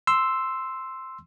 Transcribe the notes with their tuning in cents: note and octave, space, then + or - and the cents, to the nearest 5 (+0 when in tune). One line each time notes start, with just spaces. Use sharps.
C6 +0 E6 +0